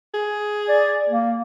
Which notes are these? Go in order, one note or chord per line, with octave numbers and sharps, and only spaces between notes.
G#4
D5
A#3